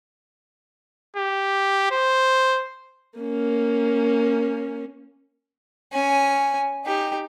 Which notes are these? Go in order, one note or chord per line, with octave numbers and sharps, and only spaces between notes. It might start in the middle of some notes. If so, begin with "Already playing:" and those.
G4
C5
A#3 C#4
C#4 G#5
D#4 G4